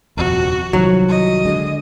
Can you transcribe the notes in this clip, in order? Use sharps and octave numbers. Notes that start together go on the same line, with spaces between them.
D#1 F2 C3 F#4
C2 D#3 F3 F#3
D#5
D3 G#3